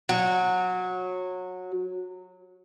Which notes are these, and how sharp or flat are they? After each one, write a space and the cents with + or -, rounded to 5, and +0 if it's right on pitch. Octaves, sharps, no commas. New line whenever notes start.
F#3 -20